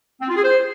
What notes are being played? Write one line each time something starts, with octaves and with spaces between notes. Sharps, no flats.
C4
F4
G#4
C5